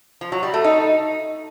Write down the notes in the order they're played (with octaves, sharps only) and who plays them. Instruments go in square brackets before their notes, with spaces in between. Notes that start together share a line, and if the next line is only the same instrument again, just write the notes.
[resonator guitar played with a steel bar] F3
F#3
G3
A3
D#4